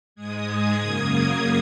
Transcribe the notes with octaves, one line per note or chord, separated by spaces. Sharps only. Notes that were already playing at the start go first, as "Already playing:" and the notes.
G#2 G#3 D#6 G#6
D#6 G#6
F#2 C#3 A#3